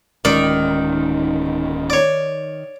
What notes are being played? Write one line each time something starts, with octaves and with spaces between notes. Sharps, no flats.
D1 D#3 G#3 C#4 D5
C#5 D5